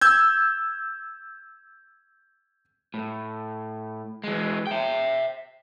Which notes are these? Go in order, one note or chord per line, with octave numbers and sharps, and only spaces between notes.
E6 G6 G#6
A2
E3 G#3
E5 G5